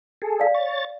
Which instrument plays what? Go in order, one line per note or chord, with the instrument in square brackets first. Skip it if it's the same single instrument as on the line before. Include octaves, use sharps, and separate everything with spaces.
[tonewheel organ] G#4 A4
[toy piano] D5 F5
[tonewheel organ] C#5 A6